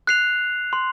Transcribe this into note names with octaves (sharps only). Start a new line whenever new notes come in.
F#6 C7 F7
C6